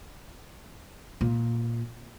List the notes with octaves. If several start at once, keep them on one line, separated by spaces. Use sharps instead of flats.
A#2